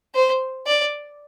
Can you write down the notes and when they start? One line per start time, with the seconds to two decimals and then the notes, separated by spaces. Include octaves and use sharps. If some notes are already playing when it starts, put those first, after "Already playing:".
0.14 C5
0.66 D5